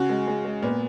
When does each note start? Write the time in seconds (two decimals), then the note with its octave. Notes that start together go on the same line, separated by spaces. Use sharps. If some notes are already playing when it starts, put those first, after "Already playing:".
Already playing: C#3 F#4
0.09 G#3
0.27 G#3
0.45 G#3
0.62 A#2 B3